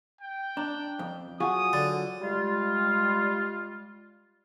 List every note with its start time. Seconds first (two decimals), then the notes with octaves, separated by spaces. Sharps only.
0.21 G5
0.57 D4 A#5
0.99 F2
1.40 F#3 F4 G#4 F#5 G#5 C#6 D#6
1.73 D3 A6
2.22 G3 G#3 F4